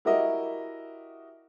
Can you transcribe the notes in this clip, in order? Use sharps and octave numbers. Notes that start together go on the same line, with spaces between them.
E4 F#4 G4 A#4 D#5 E5